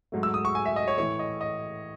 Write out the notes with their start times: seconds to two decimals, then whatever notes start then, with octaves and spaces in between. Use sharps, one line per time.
0.12 G#2 F#3 A3
0.23 E6
0.34 D#6
0.45 C#6
0.55 G#5
0.66 E5
0.76 D#5
0.88 C#5
0.98 A2 E3 A3 C#5
1.19 D#5
1.41 D#5